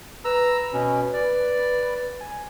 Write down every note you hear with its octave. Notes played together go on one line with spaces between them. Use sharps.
B4 A#5 E6
B2 C#4
D5
G#5